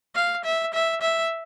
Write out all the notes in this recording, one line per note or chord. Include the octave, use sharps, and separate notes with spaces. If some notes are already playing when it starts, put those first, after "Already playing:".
F5
E5
E5
E5